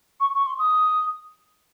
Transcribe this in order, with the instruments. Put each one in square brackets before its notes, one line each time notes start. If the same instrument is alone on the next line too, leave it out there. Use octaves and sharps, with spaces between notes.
[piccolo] C#6
C#6
C6
D#6